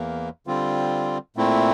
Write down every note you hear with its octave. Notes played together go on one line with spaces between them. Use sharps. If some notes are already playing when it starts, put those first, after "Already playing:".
Already playing: E2 E3 A#3
D3 G3 C4 F4
A#2 A3 C4 E4